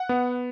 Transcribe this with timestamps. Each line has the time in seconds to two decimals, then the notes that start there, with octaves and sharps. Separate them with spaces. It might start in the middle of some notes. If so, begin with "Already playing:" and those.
Already playing: F#5
0.09 B3